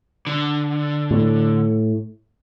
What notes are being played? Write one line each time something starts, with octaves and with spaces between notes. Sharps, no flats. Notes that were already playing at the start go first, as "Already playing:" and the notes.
D3
A2